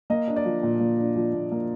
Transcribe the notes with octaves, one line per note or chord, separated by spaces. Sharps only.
A#3 D#5
D4
D5
F3
A#2
A#3
D4
F3
A#2
A#3